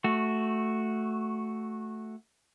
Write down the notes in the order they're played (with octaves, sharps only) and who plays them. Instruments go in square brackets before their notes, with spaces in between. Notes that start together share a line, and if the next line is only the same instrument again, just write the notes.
[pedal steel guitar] A3 F#4